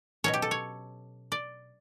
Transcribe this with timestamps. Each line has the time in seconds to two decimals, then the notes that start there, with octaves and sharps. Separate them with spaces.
0.24 B2 F#3 C#4 C#5
0.34 G4
0.42 A4
0.51 C#5
1.32 D5